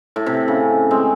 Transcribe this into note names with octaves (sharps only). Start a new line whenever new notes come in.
A2
C3
C#3
G#3 C4